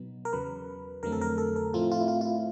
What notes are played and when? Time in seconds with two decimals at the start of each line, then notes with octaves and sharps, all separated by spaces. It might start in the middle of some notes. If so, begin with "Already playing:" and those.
Already playing: B2 F#3 B3 D#4
0.25 A#4
0.33 E2 C#3 F#3 B4
1.03 F2 D3 F#3 A3 C4 A#4
1.12 A4
1.21 A#4
1.38 A4
1.56 A#4
1.73 A2 F3 A3 C4 E4 F4
1.92 F4
2.00 E4
2.08 F4
2.21 F4
2.26 E4